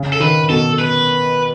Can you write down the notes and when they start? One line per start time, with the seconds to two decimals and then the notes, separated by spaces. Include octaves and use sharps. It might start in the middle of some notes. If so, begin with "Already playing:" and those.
Already playing: C#3
0.13 A4
0.20 D#3 B4
0.50 B2 A4
0.79 B4